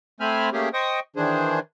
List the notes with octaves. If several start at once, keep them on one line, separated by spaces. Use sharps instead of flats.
A3 C4 C5 G#5 B5 F6
A3 A#3 C#4 G4 G#4
C5 D#5 G5 C#6 D#6
D#3 E3 D4 G#4 C5